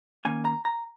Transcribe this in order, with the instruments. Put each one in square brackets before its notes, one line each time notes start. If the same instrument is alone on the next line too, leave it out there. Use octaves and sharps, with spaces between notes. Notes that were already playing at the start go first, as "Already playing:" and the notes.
[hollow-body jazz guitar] D#3 A#3 C#4 G#5
A#5
A#5